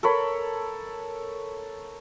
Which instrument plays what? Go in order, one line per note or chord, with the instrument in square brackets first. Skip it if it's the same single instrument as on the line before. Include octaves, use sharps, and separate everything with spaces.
[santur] A4 A#4 C#5 B5